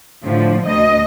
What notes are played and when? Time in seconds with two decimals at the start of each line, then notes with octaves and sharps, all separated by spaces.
0.23 A2 D3 F3
0.65 D2 D#5